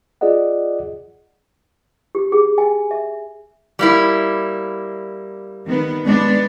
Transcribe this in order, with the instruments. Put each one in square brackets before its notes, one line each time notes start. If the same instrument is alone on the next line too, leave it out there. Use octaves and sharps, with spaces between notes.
[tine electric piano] F4 G#4 D5 D#5 F#5
[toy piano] G4
G#4
G#5
E5
[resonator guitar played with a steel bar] G3 A#3 E4
[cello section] D#3 B3
G#3 B3 D4